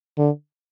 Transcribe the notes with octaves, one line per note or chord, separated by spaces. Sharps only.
D3